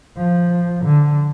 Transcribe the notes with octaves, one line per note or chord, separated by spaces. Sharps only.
F3
D3